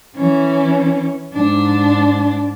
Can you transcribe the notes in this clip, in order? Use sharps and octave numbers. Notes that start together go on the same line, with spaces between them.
E3 C#4
G#2 D4